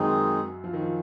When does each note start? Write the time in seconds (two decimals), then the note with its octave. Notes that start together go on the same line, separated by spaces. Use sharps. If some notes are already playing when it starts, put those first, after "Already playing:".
Already playing: F#2 D#3 F#3 G#3 C4 D#4 G#4
0.64 F3
0.73 D#3
0.82 F3